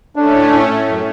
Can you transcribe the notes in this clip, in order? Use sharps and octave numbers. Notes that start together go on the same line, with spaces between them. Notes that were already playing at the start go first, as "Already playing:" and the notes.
A3 C#4 D4
A2
A2
A2
F#2